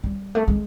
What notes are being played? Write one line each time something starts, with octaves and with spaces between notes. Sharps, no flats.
G3
A3
G#3